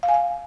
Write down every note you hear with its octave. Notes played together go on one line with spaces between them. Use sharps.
F5
G#5
F5